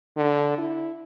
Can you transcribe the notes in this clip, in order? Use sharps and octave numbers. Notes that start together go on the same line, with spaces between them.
D3
E4